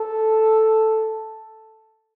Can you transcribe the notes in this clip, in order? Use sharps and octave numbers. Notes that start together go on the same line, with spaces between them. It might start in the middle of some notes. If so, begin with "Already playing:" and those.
Already playing: A4